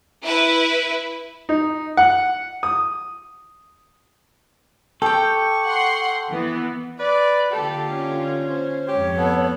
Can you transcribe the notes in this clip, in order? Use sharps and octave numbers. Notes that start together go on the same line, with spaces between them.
E4 B4
D#4
F#5
D#6
G4 A4 G5 C#6
F#5 C6
E3 B3
B4 D5
D3 A#3 F4 G4 A4
C#4
C5
F2 G#2 G4 C#5
B3 A4